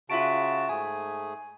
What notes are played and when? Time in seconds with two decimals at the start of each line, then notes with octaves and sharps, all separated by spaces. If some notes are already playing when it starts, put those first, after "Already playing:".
0.10 C#3 F4 F#4 E5 A5 D7
0.69 G#2 A3 G#4 G#5